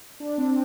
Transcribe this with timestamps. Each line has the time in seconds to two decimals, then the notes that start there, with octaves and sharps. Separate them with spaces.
0.20 D4
0.38 C4